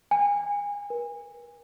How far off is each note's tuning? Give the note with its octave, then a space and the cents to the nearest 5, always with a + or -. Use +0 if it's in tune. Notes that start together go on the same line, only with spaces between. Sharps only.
G#5 -30
A#4 +45